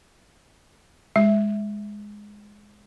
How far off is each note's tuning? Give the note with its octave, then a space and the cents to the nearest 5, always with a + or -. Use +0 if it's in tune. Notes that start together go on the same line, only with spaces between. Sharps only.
G#3 +0 E5 +0